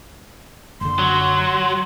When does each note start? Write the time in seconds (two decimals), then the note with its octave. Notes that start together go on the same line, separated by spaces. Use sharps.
0.81 F#1 D3 C6
0.99 F#3